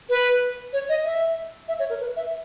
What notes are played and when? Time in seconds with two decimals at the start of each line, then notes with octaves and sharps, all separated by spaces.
0.10 B4
0.73 C#5
0.89 D#5
1.04 E5
1.68 E5
1.79 C#5
1.90 A#4
2.00 B4
2.16 E5